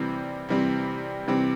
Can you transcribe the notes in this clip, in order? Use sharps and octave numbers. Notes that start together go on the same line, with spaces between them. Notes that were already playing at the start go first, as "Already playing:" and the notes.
Already playing: C3 E3 G3 C4
C3 E3 G3 C4
C3 E3 G3 C4